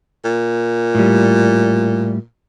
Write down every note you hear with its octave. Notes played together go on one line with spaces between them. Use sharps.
A#2
A2 G3